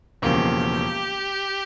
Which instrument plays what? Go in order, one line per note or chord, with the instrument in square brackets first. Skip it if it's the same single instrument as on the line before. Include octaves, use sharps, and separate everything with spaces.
[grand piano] E1 E2 C#3 F3 A#3 [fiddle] G4